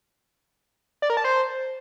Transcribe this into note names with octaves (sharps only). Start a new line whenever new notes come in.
D5
A#4
A5
C5